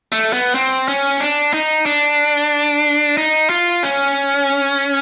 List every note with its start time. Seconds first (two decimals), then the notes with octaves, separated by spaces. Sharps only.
0.12 A3
0.33 B3
0.55 C4
0.88 C#4
1.20 D4
1.53 D#4
1.86 D4
3.17 D#4
3.50 F4
3.83 C#4